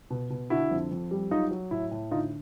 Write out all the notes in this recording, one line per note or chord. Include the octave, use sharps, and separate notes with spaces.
B2
B2
D3 E4 F#4
F2
F2
G3
F#3 D#4 F4
F#3
A2 E4
A2
D3 D#4 F4